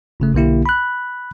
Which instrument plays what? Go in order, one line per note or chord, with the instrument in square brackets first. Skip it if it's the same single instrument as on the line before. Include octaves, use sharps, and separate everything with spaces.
[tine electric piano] G1 C#3 A3
B1 D3 A#3 E4 G4
B5 F#6